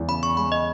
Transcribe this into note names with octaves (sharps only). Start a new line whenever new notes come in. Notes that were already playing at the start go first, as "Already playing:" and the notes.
Already playing: E2 G#3
C#3 B5
C#6
G#3 B5
D#5